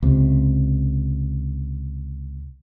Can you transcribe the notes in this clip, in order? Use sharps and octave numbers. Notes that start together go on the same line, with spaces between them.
C#2 C3